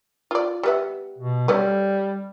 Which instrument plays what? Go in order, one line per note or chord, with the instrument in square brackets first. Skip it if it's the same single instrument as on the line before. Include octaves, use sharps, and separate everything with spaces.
[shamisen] F4 D5
G3 B3 E5
[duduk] B2
[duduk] G3 [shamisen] A3 C#4 B4